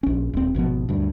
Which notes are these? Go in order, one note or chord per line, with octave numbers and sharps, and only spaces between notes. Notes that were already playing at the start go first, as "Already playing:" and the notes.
A#1 C#4
D#1 C4
G#1 B2 F3 B3
D2 G2